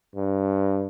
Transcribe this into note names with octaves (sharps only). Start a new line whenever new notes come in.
G2